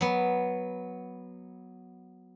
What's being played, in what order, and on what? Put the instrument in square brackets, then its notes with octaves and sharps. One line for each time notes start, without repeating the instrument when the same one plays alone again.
[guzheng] F#3 B3